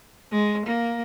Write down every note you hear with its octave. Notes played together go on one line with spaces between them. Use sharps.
G#3
A#3